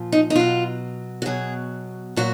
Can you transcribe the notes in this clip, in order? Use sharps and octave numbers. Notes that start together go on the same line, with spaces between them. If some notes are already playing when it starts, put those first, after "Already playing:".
Already playing: A#2 F3
D#4
D#4
B2 F#3 F4
F#4
B2 F#3 G#4
A#2 F#3 F#4